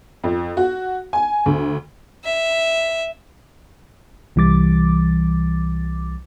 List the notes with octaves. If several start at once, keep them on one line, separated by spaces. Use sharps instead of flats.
F2
F#4
G#5
D2
E5
C2 E3 G3 D6 A6